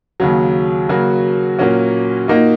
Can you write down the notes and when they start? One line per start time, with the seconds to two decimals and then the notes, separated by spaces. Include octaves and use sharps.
0.20 D#2 C#3 F#3
0.89 C#3 F#3 A#3 F#4
1.59 A#2 F#3 A#3 C#4 F#4
2.28 A#2 A#3 D#4 F#4